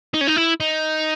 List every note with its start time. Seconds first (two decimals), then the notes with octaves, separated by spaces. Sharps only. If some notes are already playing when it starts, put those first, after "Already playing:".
0.14 D#4
0.21 C#4
0.27 D#4
0.36 E4
0.60 D#4